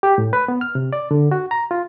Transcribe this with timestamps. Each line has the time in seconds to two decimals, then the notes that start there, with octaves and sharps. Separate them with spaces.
0.03 G4
0.18 A2
0.33 B4
0.48 B3
0.61 F6
0.75 C3
0.93 D5
1.11 D3
1.31 F#4
1.51 A#5
1.71 F4